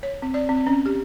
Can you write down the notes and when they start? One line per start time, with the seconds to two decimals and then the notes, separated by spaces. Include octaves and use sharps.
0.03 C#5
0.22 C4
0.34 D5
0.49 C4
0.67 C#4
0.86 G4